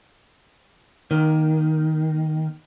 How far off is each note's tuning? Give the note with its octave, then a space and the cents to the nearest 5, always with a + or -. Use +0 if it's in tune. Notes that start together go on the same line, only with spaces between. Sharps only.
D#3 +5 A#3 +20